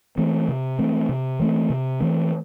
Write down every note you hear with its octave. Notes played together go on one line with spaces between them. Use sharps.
E3 A3 C4
C3
E3 A3 C4
C3
E3 A3 C4
C3
E3 A3 C4